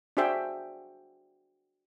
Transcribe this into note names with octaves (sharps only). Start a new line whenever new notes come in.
D4 F#4 G#4 C5 E5 G5